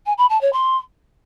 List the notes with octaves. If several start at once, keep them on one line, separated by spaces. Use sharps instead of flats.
G#5
B5
A5
C#5
C6